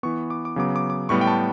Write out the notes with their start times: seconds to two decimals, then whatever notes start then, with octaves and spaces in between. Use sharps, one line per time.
0.03 E3 B3 C#6
0.30 D6
0.45 D6
0.56 C#3 F#3 B3 D6
0.76 D6
0.90 D6
1.09 A2 G3 B3 C#6
1.21 G5
1.27 A5